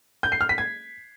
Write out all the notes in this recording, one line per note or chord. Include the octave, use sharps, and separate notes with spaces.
G6
C7
F6
B6
G#6